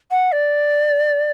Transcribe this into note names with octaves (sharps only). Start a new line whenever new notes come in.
F#5
D5